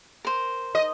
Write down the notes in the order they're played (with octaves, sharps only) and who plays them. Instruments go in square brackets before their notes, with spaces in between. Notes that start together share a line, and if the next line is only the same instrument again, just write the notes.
[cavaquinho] A#4 C5
[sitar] D#5